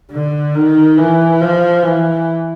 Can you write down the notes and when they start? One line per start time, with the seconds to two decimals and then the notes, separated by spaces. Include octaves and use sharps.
0.12 D3
0.55 D#3
0.97 E3
1.41 F3
1.83 E3